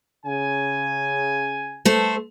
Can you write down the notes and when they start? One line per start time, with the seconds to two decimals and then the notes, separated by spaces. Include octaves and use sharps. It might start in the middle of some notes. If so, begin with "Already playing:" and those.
0.25 C#3 G#5
1.85 A3 A4 C5